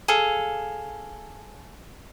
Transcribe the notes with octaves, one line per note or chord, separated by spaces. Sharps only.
G#4 A4 F5